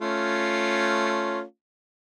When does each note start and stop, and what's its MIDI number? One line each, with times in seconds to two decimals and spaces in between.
0.01 1.43 57
0.01 1.43 61
0.01 1.43 65